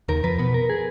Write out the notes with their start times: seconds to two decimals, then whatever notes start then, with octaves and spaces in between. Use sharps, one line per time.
0.08 D#2 D#3 A#4
0.23 F2 F3 B4
0.39 B2 B3 B4
0.54 A#4
0.69 G#4